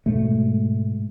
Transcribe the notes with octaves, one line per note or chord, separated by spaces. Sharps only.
G#2 B2 G#3 A3